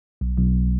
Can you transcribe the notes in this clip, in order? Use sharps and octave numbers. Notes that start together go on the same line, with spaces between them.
B1
B1